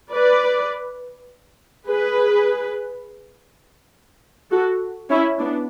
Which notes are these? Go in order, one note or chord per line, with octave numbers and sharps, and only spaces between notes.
B4 D5
G#4 B4
F#4 A4
C#4 E4
B3 D4